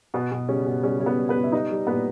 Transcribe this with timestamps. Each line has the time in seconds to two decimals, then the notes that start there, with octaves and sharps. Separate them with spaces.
0.14 B2 B3
0.32 B2
0.48 C#3 G3 C#4
0.67 B2
0.83 C#3 G3 C#4
1.01 G3 C#5
1.06 B3 B4
1.17 G3
1.29 B3 B4
1.35 B2
1.44 E5
1.52 G3 D#4 D#5
1.71 G3
1.87 A#2 B3 B4